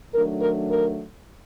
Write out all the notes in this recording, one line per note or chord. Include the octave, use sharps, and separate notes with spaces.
D#3 F#3 A3 D4 A#4
A#4
A#4